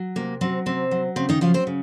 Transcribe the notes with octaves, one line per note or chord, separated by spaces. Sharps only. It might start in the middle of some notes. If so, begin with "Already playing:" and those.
Already playing: F#3
C3 A#3
F#3 C4
C3 C4
F#3
C#3 C4
D#3 D#4
F3 F#3 F4
C4 C5
C#3